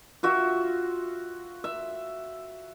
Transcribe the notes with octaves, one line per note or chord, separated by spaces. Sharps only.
F4 F#4 E5
E5